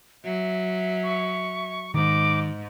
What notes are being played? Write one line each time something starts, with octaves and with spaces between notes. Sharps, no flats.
F#3 E5
C#6
G#2 D#3 D6